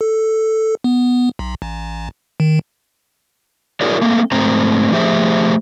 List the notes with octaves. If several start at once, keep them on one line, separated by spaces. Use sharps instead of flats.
A4
B3
B1
A1
D#3
E4 F#4 G#4 A#4 C#5 D5
A3 A#3 C4
G#2 A3 C4 C5 A#5
F3 A3 G4 G#4 C5 E5